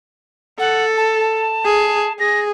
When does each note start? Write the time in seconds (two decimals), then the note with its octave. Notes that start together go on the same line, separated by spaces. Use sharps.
0.59 A4 F#5
0.97 A5
1.65 G#4
2.20 G#4 A#6